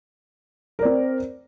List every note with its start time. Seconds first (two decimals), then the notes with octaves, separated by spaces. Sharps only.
0.79 A#4
0.82 D5
0.85 C4